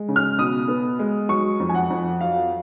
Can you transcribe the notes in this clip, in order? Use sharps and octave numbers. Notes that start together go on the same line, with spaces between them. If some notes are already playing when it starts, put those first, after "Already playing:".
Already playing: G#3
C#3
F6
B2 D#6
B3
G#3
F#3 C#6
F2
G#5
F#5
F2
F#3 F5